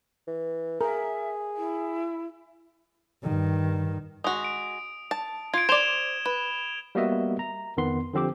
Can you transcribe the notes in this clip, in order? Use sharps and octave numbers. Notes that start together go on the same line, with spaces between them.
E3
G#4 A#4 E5
E4
G2 D#3
G#3 F#4 D#6
D7
A5
F4 G#6 D7
C5 D5 E7 F7 G7
B4
G3 A#3 B3 F#4 D#5 E5
A#5
F2 D#3 B3 C6
D3 F3 C4 G4 D6